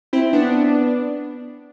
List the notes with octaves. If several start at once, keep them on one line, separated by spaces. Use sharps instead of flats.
C4 E4
B3 D4